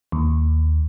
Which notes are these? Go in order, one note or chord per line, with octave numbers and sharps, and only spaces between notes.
D#2